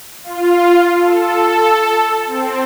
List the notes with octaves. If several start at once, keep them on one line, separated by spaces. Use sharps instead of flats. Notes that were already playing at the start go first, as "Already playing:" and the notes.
F4
A4
C4